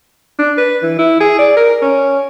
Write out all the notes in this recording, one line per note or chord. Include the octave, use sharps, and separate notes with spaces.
D4
B4
E3
E4
G#4
D5
A#4
C#4